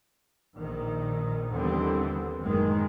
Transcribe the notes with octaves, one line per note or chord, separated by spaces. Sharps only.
A#1 D#3
D#2 D3 E3 G3 B3 C4
F#1 A2 D#3 G#3